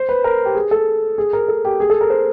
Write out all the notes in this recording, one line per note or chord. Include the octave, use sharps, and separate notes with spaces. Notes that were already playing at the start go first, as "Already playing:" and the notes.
Already playing: C5
B4
A#4
G4
G#4
A4
G#4
A#4
A4
G4
G#4
A4
A#4
C5